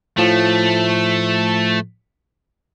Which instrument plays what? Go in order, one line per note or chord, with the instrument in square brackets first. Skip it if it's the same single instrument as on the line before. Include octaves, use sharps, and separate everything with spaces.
[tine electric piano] A2 F3 [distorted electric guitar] A3